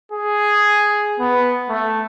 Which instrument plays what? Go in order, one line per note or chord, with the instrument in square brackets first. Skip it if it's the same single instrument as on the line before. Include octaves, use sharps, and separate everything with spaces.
[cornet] G#4
B3
A3